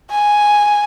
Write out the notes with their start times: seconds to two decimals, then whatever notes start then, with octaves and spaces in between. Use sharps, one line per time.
0.11 G#5